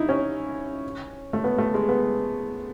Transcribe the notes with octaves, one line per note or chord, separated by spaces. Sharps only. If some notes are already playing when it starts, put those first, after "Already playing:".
Already playing: D#4 E4
C#4
A3
B3
A3
G#3
B3